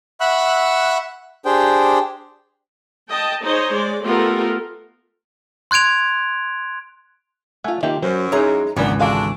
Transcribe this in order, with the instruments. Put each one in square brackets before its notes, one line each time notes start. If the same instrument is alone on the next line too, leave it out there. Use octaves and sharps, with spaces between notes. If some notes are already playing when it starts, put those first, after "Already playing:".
[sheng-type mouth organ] E5 F#5 B5 C#6 E6 F#6
D4 G4 G#4 C5 G5
[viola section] D#5 G5 A5
D#4 G#4 C5 C#5 D#5
G#3 D5
A3 B3 F4 G4 A4 A#4
[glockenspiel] C6 F#6 G#6 D7 F7
[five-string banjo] A3 F4 [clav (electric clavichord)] E5 F#5 G#5
[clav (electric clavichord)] D#3 A#3 [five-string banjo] F4 G4 E5
[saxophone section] F#2 [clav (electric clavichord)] F#3 [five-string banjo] C5
[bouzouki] G#3 A#5 [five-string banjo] D#4 C#5 [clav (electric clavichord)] E4
[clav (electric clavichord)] G#1 C#2 D5 [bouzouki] E3 [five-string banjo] F#3 A#3 D4 [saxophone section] B3
[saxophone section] D3 D4 F#4 [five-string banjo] G#4 F5